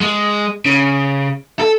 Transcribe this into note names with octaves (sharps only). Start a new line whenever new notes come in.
G#3
C#3
A4